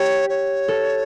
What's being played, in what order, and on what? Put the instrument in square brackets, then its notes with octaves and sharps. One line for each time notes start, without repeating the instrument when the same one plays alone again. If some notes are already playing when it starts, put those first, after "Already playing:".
Already playing: [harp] G4 [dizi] C#5
[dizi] C#5
[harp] A4